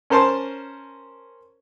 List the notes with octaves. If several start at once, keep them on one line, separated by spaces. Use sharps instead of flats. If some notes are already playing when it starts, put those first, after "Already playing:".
C#4 A#4 C5 A5 C6